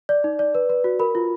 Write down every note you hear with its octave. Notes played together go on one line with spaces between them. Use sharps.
D5
D#4
D5
B4
B4
F#4
A#4 B5
F4